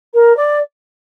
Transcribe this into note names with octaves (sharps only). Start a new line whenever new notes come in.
A#4
D5